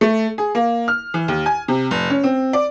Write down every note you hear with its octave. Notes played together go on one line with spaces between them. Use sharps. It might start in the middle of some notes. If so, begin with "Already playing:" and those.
A3
G#4
A#3
F6
E3
D#2
G#5
C3
F1
C#4
C4
D5